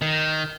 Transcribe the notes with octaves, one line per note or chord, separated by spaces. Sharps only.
D#3